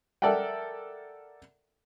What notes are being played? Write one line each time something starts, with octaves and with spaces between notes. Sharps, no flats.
A4 A#4 D5 E5 F#5 G5